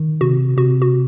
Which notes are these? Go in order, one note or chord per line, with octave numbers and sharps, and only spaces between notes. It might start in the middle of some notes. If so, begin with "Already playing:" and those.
Already playing: D#3
C3 F#4
C3 F#4
F#4